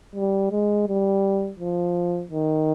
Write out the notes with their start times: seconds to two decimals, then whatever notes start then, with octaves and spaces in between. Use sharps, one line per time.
0.15 G3
0.51 G#3
0.87 G3
1.59 F3
2.31 D#3